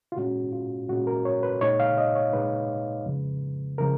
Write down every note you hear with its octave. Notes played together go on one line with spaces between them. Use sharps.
F4
A#2 G#3 C#4 F#4
F4
A#2 G#3 C#4 F#4
A#4
C#5
B4
A#2 G#3 D#4 C#5
F5
D#5
C#5
A#2 G#3 D#4 B4
F2 C#3 F3 G#3
C#3 F3 G#3 A#4